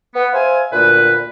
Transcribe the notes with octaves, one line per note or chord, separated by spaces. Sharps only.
B3
C5 E5 F5 G#5
D2 A#2 B4